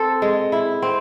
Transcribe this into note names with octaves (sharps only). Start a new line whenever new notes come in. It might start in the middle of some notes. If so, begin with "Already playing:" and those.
Already playing: C4 A4
G#3
E4
C4